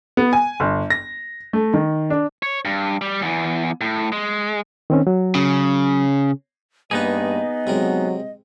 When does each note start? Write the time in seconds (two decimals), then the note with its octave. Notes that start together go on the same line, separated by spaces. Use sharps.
0.17 B3
0.33 G#5
0.60 G1
0.90 A#6
1.53 A3
1.74 D#3
2.10 D4
2.43 C#5
2.65 G2
3.01 G3
3.22 E2 E3
3.81 A2
4.12 G#3
4.90 D#3 C4 C#4
5.07 F#3
5.35 C#3
6.91 G2 A#3 B3 D#4 G#4 B4 D#5
7.67 C3 F#3 G#3 A#4